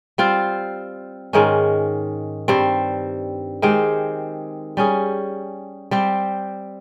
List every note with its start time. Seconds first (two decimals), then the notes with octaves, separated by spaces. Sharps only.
0.18 G3 C4 F4
1.33 G#2 D#3 G#3 C#4
2.48 G2 G3 C4
3.62 D#3 G#3 C4 G4
4.77 G3 C#4 G#4
5.91 G3 C4 G4